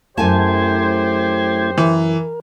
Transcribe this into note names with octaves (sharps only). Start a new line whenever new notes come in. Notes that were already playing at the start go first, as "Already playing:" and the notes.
F#2 A3 E4 G4 C5 G#5 A5 G#6
E3 A#4